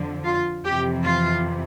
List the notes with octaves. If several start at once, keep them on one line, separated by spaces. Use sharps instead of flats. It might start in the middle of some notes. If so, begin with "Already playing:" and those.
Already playing: F2 D3 F3
F4
F2 C3 E3 G4
F4